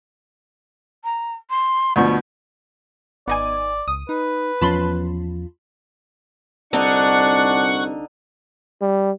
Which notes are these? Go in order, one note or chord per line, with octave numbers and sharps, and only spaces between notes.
A#5
C6
D2 B2 F3 C#6
G#1 B3 D#4 D5 G#5
C#2 D#6
D#4 B4
E2 F3 C#4 F4 A5 B5 C6
C2 D3 D4 D#4 F#5 C#6
G3